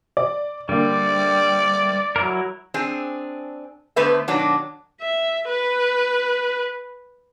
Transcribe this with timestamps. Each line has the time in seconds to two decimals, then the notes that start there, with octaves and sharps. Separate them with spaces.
0.17 D5
0.69 D3 G3 A#3 D5
2.16 F#3 E4 A#4
2.74 C4 D4 G#4
3.96 D3 A3 B3 B4 C5 E5
4.28 B2 D#3 F#3 D4
5.01 E5
5.49 B4